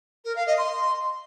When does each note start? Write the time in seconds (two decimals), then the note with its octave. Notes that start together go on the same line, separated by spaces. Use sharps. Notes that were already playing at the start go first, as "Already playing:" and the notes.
0.25 A#4
0.36 F5
0.47 D#5
0.58 C6